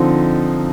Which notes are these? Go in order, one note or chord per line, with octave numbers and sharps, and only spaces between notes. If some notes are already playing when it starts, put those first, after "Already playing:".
Already playing: D3 F3 C4 D#4